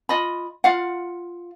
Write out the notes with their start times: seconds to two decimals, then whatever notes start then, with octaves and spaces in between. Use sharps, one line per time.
0.09 F4 D#5 B5
0.64 F4 F5 F#5